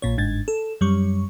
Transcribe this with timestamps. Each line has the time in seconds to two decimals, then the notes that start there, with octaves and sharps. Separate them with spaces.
0.02 A#1 A#2 C#5
0.18 G1 G#2 G#6 A6
0.48 A4
0.81 F#2 G3 C#6